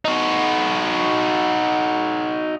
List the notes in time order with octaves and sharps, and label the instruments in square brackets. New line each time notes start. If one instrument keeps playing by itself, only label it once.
[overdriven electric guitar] D#4 F#4